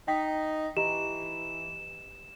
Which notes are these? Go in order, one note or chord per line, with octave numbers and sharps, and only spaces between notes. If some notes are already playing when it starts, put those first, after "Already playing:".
D#4 G5 B6
E3 G4 D#5 A#5 E7